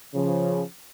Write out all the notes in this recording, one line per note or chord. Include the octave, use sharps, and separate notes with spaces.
C#3 F3